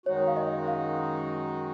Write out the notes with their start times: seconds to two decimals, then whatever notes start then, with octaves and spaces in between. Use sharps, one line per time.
0.06 F#2 D#3 G#3 D#4 F#4 C#5
0.28 F5
0.37 D#5
0.68 F5